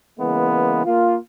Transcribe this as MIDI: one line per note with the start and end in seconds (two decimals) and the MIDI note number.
0.20 0.85 49
0.20 0.85 52
0.20 0.85 56
0.20 0.85 58
0.20 0.85 59
0.85 1.17 58
0.85 1.17 65